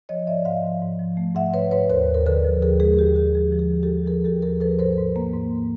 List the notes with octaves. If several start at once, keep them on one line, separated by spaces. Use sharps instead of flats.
F3 C#5 D#5
G#2 D5 E5
G#2 D#5 F5
F3
G#2
F3
A3
G#2 E5 F#5
G#2 B4 C#5
G#2 B4 C#5
D#2 A#4 C5
D#2
A#4
D3 A4 B4
F3
D#2 G#4 A#4
G#3 G#4
G#4
D#2 G4
D3 G#4
F3 G#4
F3
G#4
D#2
G4 A4
D#2
F3 G#4 A#4
D#2 G4 A4
F3 G#4 A#4
F3 A4 B4
G#2 A#4 C5
G#2
A#3
G#2